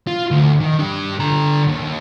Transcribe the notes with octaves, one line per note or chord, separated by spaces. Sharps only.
F4
D2
D#3
D4 G4
D3 A#5
D#2